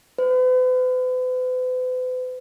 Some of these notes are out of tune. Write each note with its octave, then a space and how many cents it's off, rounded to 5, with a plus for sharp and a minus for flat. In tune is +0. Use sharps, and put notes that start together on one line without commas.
B4 +45